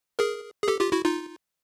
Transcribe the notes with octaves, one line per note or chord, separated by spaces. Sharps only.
G#4 A#4
G#4
G4 A4
F4 G4
E4 F#4
D#4 F4